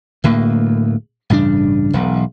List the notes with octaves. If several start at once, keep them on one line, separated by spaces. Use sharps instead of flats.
D1 D2 A2 A#3
A1 G2 C#3 D4
E1 B1